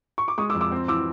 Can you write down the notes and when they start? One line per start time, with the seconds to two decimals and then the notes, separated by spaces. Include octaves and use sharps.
0.18 C#6
0.28 D6
0.38 G#3 C#6 D#6
0.50 D6 E6
0.55 F2
0.61 D6 E6
0.71 C4
0.88 E3 D6 E6